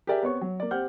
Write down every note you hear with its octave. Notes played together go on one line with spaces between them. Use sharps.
G4 G#4 A#4 D5 E5 G#5
B3 C4 C#5 C#6
F#3
A#3 D5
C4 G4 F#5 F6 G6